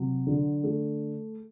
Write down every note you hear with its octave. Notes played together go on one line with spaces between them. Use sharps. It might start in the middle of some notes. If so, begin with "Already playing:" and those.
Already playing: C3 F#3
D3
A3